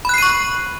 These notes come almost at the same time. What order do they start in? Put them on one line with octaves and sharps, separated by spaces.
B5 F#6 C7 D#7 C#6